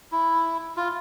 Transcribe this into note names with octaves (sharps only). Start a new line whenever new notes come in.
E4
F4